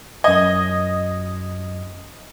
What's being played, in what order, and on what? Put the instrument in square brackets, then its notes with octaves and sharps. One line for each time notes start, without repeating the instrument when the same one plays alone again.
[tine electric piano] F#2 G#6 [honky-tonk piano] D#5